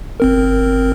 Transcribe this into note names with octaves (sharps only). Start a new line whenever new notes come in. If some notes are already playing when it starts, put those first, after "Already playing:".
G1 C4 A#4